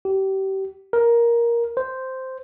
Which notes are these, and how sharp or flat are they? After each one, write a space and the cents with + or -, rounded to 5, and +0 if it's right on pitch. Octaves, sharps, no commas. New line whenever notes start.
G4 -30
A#4 +10
C5 -5